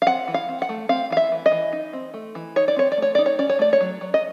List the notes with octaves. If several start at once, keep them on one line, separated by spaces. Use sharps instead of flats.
F5
C4 F#5
E3
F5
C4
F#5
A3
C4 F5
E3 F5
E5
E3
D#5
E3
D#4
C4
A3
E3
D#4 C#5
D5
C4 C#5
D5
A3 C#5
D#4 D5
C#5
C#4 D5
C#5
A3 D5
C#5
F#3
F#3
D#5